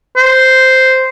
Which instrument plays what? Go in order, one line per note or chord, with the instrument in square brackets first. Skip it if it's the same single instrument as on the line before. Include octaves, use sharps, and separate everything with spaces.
[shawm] C5